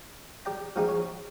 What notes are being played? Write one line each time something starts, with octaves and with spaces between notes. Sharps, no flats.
G4 D5 G5 A#5
F3 G3 A#3 D#4 G4 G#4
C#5